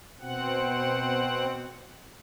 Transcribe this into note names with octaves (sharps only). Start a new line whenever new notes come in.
B2 C4 F#5